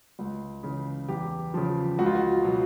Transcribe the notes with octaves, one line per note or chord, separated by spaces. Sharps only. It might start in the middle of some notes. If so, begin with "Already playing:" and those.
C#2
C#3 E3
E2 G4
C#3 F3
C#2 F#4
F4
F#4
B2 F#3